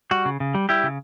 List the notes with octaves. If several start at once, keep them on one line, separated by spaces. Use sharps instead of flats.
G3 F#4
C#3
C#3
G3
G3 E4 G4
C#3